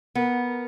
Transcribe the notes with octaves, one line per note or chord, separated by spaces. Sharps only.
B3 A#4